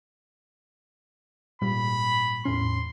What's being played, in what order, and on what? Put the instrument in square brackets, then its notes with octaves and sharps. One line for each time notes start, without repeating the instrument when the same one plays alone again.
[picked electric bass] G#1 A#2 G3 [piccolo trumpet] B5
[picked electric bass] E2 A2 C#4 [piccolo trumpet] C6